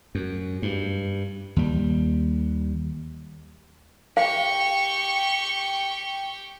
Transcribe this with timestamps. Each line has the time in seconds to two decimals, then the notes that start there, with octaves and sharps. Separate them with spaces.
0.15 F#2
0.62 G2
1.56 D#2 G3
4.17 G4 F5 G5 C#6